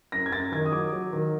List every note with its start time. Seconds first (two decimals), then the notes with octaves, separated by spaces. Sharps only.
0.12 F#2 A#6
0.26 G#6
0.32 F#2 A6
0.52 D#3 G#6
0.66 D#6
0.72 F#3 D6
0.92 F#3
1.13 D#3